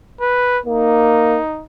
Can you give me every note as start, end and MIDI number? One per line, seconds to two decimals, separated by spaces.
0.21 0.59 71
0.66 1.38 58
0.66 1.64 63